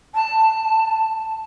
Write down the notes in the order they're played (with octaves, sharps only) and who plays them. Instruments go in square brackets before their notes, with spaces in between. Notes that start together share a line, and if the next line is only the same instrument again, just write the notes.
[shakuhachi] A5